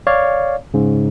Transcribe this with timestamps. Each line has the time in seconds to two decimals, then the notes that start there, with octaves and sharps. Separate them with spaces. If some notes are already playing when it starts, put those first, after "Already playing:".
0.07 C#5 D5 F5
0.74 G#2 C#3